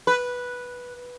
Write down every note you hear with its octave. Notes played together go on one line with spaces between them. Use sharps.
B4